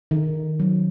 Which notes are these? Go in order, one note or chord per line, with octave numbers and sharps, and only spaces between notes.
D#3
F#3